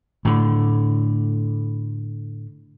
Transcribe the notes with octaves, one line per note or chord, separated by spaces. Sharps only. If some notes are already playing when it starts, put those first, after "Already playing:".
A2 D3